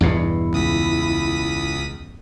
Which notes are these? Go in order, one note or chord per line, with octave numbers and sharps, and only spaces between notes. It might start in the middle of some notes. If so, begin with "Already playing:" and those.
E2 G2 B2 E4
C#2 D#6 B6